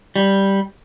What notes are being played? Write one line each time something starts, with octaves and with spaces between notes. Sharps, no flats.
G3